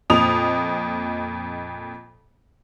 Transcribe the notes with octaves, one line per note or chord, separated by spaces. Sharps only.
F2 A#2 D#5 D#6 F7